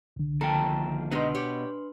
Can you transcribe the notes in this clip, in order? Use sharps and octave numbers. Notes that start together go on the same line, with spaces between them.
C2 D3
D#2 F3 A4 G5 A#5
B2 G#3 B3 D4 D#4 G4 B4 C6
G4 C#5 D5